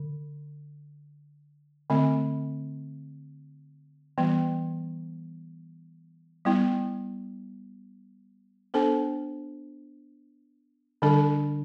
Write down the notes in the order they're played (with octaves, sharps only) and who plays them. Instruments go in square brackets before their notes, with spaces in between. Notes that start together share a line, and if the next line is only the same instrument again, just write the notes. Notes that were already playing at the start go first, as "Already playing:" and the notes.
Already playing: [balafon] D3
D3 A3 C4
E3 G3 B3
G3 B3 E4
B3 D4 A4 C5
D3 G3 D4 A4